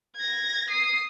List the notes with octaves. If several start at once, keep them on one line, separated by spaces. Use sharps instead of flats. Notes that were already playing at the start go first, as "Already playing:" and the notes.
G#6 A#6
D#6 C7